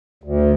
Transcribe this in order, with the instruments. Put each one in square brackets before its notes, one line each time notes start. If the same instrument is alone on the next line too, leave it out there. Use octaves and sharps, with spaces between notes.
[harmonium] D2